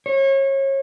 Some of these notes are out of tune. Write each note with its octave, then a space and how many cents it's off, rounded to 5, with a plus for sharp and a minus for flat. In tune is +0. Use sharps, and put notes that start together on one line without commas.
C#5 -30